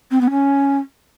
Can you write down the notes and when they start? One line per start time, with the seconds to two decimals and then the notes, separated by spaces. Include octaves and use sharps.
0.11 C4
0.21 B3
0.31 C#4